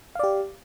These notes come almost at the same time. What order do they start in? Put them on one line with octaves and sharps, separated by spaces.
F5 D5 G4